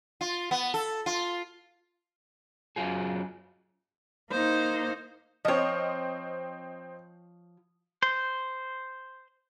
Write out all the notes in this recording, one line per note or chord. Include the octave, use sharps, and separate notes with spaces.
F4
B3
A4
F4
F#2 F#3 F4 G#4
A#3 D#4 C5
F3 C4 C#5 D#5
C5